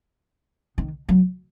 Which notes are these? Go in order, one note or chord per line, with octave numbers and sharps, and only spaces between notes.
D#3
F#3